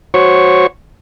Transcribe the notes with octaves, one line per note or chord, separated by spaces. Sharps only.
F#4 C5 C#5 C#6